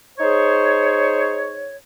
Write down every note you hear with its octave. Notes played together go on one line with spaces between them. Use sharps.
D#4 G#4 C5 C#5